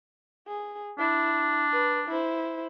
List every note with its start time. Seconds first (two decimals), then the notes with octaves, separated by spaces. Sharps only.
0.47 G#4
0.99 D4 E4
1.73 B4
2.08 E4 C5